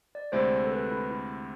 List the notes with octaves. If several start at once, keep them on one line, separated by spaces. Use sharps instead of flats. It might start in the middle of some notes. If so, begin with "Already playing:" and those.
D5
D2 C3 G#3 C4 E4 C5
A4
B4
E4
E4